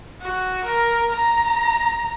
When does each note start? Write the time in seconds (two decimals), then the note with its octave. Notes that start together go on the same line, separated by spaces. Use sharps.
0.22 F#4
0.65 A#4
1.11 A#5